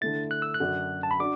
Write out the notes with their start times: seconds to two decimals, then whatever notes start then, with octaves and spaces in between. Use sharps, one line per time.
0.01 D3 A3 E4 A6
0.31 F#6
0.42 E6
0.54 F#6
0.60 F#2 D3 F#3 D4 F#4
1.03 A5
1.11 B5
1.19 D4 F#4 D6